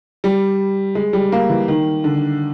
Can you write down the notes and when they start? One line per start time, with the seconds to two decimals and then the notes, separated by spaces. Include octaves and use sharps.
0.24 G3
0.95 G#3
1.13 G3
1.32 A#3
1.49 E3
1.68 D#3
2.04 D3